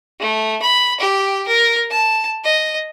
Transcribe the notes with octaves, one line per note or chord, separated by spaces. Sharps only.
A3
B5
G4
A#4
A5
D#5